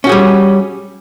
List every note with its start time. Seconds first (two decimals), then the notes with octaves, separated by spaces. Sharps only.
0.04 C#4
0.07 F#4
0.09 G#4
0.12 G3